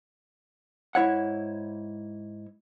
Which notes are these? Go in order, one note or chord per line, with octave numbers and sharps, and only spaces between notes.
G#2 E4 C#5 F#5